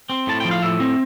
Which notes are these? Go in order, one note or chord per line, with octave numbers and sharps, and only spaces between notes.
C4
A2 A5
F3 G5
F5
A2 E5
C4